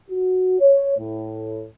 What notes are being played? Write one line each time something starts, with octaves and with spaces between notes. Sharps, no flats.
F#4
C#5
A2